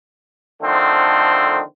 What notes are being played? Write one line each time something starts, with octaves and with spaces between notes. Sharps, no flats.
D3 D#3 F3 A3 C4